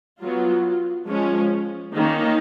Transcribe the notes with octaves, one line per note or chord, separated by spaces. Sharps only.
F#3 B3 F4
F3 G#3 C#4
D#3 A#3 C#4 D#4